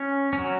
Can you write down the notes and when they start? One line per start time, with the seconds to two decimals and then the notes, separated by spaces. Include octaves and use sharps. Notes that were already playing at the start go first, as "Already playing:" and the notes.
Already playing: C#4
0.33 C#4
0.38 F#3